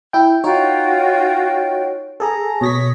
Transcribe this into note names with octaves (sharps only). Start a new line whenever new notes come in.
E4 G5
D#4 F4 F#4 C#5 G5
G#4 A4 A#5
B2 C#5 C#6 D#6 A#6 B6